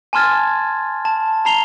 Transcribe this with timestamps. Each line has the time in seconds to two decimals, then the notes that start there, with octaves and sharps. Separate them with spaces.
0.13 G#5 A5 C6 F6 G#6 A6
1.05 A5
1.45 A5 A#5 C7 F7 G7